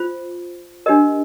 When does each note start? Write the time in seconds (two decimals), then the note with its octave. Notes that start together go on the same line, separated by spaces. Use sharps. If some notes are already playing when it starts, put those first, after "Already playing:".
Already playing: F4 C5
0.86 D4 G4 A#4 D#5